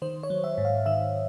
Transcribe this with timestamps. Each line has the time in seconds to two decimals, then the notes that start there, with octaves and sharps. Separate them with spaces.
0.02 D#3 C5
0.23 C#5
0.30 F#3
0.44 E5
0.58 G#2
0.65 F5
0.86 D#3 E5